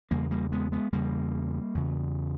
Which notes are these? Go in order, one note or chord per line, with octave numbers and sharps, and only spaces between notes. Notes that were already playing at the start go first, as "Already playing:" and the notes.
E2 C#3 G3 A#3
G3 A#3
G#3 B3
G#3 B3
E2 C#3 G3 A#3
E2 C#3